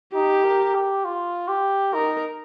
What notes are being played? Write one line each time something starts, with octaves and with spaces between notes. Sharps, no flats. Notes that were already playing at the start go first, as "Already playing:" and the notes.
D#4 G4
A#4
G4
F4
G4
D#4 A#4